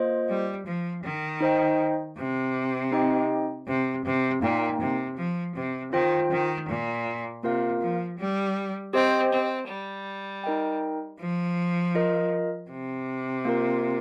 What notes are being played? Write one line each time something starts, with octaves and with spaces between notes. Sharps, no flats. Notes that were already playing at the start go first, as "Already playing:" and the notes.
Already playing: A#3 F4 C5 D#5
G3
F3
D#3
D#4 C5 D#5 G5
C3
C4 D#4 G4 D#5 G5
C3
C3
A#2 A#3 D#4 A#4 G5
C3
F3
C3
D#3 F4 C5 G5
D#3
A#2
C3 A#3 F4 A#4 F5
F3
G3
C4 G4 C5 D#5 G5
C4
G3
D#4 A#4 D#5 G5
F3
F4 A#4 D#5
C3
A#3 F4 A#4